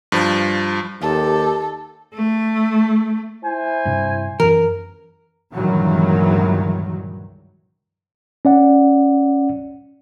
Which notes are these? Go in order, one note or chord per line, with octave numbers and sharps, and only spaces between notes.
G2 F3
D#2 G4 A4
A3
E4 C5 G#5
G2 C3
F#2 E3 A#4
C#2 G2 A#2 D#3 E3 F#3
C#4 D5 F#5